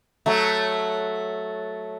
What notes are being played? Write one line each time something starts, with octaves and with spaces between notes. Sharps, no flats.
F#3 A3